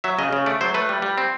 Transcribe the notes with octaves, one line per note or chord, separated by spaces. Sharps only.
F#3 E5
C#3 D#5
C#3
A3 D5
F#3 C5
A3 B4
G3
G3
C4